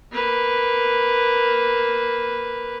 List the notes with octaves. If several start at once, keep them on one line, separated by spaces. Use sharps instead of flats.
A#3 B4